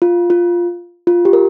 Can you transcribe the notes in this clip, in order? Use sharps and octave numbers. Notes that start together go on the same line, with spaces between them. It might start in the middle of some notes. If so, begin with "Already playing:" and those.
F4
F4
F4
G4
A#4